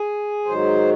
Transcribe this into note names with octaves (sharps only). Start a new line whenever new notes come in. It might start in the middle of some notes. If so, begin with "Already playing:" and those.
Already playing: G#4
G#2 D#3 F#3 C5